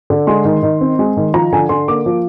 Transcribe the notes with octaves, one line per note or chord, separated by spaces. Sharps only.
D3
G#3 C6
D#3
D#3
C4
G#3
D#3
F3 A#5
D3 G#5
D3 C6
A#3 D6
F3